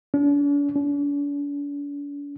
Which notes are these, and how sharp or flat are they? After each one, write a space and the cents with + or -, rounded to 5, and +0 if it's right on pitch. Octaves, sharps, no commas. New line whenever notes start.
D4 -45
D4 -45